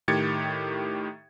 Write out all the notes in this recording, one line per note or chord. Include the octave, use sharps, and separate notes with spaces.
A2 D#3 G4 G#6 A6 C#7